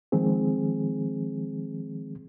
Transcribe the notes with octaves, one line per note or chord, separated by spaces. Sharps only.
D#3 F3 G#3 C4 G#4